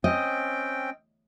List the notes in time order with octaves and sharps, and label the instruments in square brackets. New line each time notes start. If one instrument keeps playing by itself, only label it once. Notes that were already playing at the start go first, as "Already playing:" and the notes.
[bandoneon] C4 C#4 G5 [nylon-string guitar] D#5